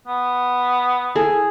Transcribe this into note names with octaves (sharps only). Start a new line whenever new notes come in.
B3
E4 G#4 A4